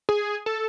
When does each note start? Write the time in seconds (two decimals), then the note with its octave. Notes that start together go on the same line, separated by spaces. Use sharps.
0.09 G#4
0.46 A4